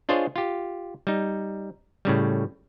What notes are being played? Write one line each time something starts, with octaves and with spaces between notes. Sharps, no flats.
D4 F4 G#4 C5 C#5 D#5
F4 G4
G3 D#4
A2 C#3 G3